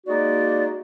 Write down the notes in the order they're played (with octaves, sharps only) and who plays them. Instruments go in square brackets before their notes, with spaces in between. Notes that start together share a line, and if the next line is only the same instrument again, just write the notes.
[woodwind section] G#3 A#3 D#4 F#4 D5